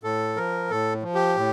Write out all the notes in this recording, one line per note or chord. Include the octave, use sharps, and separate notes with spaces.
A2 A4
F3 A#4
A2 A4
F3
G4
A2